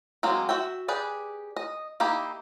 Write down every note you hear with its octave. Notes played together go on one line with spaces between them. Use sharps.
F#3 G#3 A#3 C4
F#4 E5 G5
G4 G#4 B4 D5
D#5
A#3 D#4 E4 G4